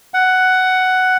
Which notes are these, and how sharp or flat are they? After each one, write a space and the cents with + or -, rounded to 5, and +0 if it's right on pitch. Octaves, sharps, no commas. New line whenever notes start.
F#5 +10